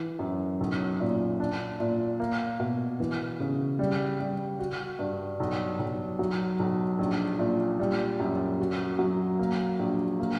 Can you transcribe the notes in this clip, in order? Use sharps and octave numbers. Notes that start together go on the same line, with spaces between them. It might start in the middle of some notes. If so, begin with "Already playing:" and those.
Already playing: E3
F#2
B1
A#2
D4
A#2
A#3
B2
E3
C#3
G3
G3
F#4
G2
B1
B1
F#3
B1
A#1
A#2
G3
F#2
F#4
F#3
A#3
A#1
A#3